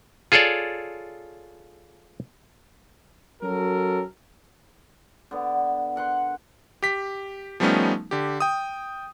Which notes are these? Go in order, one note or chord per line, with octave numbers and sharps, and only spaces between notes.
F4 G#4 A4 C#5 D5
F#3 C#4 F#4 A4 A#4
D3 B3
A#4 F#5 C6
G4 B6
F3 G3 A3 B3 C#4 D#4
D3 G4
G5 D#6